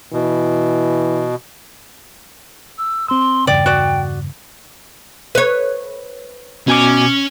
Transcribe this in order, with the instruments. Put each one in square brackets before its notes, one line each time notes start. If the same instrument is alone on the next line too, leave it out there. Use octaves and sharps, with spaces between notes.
[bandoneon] B2 [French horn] E3
[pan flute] E6
[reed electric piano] C4 E6 [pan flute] C6
[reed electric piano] E2 G2 C#3 [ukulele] D5 [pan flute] G5
[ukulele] F#4 D5
[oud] B4 C#5
[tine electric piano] B2 G#5 D6 [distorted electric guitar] C#4